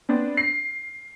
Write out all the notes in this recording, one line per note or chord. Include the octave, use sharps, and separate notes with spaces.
B3 C4 D4
C7